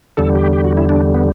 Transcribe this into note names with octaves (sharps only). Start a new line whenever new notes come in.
E2 D3 G3 A4
G4
G4
F#4
E4
D4
B3